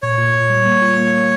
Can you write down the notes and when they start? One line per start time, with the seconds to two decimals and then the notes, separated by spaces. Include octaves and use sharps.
0.02 A#2 C#5
0.18 A#2
0.34 A#2
0.50 G3
0.66 A#3
0.82 F4
0.97 A#3
1.14 A#3